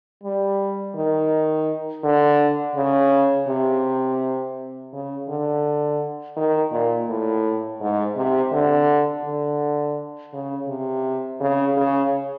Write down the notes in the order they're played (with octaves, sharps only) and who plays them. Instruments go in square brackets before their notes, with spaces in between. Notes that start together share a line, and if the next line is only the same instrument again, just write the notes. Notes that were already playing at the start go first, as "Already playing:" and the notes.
[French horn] G3
D#3
D3
C#3
C3
C#3
D3
D#3
A#2
A2
G#2
C3
D3
D3
C#3
C3
C#3
C#3